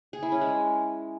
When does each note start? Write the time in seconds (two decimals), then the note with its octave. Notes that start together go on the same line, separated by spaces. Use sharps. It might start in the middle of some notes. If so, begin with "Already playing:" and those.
0.13 G#4
0.23 E4
0.32 C#4
0.41 G#3